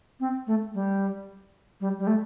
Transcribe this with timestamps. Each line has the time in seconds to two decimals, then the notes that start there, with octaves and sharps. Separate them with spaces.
0.20 C4
0.47 A3
0.74 G3
1.80 G3
1.99 G3
2.07 A3